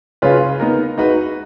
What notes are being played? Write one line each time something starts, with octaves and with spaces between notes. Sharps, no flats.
C#3 G#3 C#4 F4 B4
B3 D#4 A#4
G#3 D#4 F#4 B4